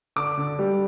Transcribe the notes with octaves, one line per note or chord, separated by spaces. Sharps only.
D3 D6
D3
G3